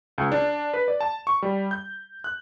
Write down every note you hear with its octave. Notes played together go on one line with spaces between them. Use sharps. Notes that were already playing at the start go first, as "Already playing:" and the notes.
C#2
D4
B4
D5
A5
C#6
G3
G6
F#6